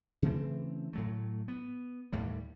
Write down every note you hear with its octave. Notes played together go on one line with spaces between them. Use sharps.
C#3 E3 A3 C4
A2 F#3 A3
B3
D#2 A2 G3